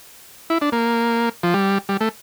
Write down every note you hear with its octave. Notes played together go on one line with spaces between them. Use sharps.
E4
D4
A#3
F3
G3
G3
A3